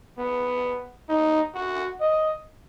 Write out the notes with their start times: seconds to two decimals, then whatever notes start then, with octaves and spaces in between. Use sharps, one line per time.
0.18 B3
1.09 D#4
1.54 F#4
2.01 D#5